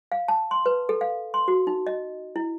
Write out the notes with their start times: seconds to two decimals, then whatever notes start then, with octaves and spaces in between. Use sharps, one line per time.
0.12 F5
0.28 A5
0.51 C6
0.66 B4
0.89 A4
1.01 F5
1.34 C6
1.48 F#4
1.67 D#4
1.87 D#5
2.36 E4